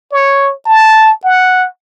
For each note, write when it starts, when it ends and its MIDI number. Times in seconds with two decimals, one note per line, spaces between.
0.12 0.52 73
0.66 1.13 81
1.24 1.67 78